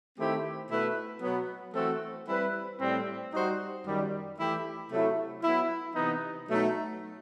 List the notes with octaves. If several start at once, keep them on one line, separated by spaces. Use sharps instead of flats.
D#3 A3 C4 E4 G4
B2 A3 E4 B4
B2 F#3 B3
E3 A3 C4 F#4 A4
G3 C4 E4 B4
A2 G3 C4
G3 D#4 F#4 C5
F#2 D#3 G3
E3 A3 E4 G4
C3 F#3 A3 E4
F#3 B3 E4
C3 E3 B3 D#4
B2 F#3 A3 D#4